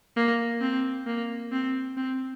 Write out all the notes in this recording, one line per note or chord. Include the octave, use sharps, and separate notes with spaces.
A#3
C4
A#3
C4
C4